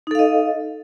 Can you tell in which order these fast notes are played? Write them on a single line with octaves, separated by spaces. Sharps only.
D#4 A4 F5 D#5